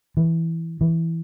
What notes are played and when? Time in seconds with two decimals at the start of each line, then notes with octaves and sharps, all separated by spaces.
0.17 E3
0.81 E3